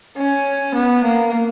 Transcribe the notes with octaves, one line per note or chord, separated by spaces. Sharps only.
C#4
B3
A#3